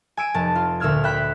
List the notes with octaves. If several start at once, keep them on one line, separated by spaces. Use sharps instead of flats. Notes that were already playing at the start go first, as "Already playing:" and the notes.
G#5 E6 D7 D#7
F1 A5
F4
D2 A#2 E6 F6 G#6
E5 G5 B5 F#6 B6